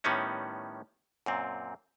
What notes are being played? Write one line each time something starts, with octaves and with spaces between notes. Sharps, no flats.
A2 D#3 G3 B3 C#4 D#4
F#2 A#2 C4